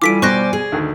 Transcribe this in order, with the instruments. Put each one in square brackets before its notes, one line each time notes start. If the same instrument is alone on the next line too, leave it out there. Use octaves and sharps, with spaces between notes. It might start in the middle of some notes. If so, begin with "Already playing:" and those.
[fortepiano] E3 F4 A4 [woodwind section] G3 G#5 [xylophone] D6 B6 D7
[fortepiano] B2 [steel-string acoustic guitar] C5 D5 [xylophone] C#6 F#6 A#6
[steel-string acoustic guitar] G#4
[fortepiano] D2 D#3